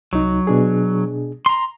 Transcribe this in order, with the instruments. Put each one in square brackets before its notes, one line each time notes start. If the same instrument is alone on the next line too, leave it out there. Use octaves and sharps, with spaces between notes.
[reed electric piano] C2 D#4 [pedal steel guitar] F#3
[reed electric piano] B2 D4 G#4
[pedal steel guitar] A#5 C6